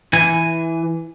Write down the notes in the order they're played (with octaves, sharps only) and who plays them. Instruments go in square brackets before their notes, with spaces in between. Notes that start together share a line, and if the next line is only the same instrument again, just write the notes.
[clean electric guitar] E3 G#5